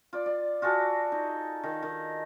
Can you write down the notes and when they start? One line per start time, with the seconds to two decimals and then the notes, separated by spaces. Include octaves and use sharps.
0.13 F4 D5
0.26 D5
0.62 F4 F#4 G#4 A4
1.12 D#4
1.63 D#3
1.83 D#3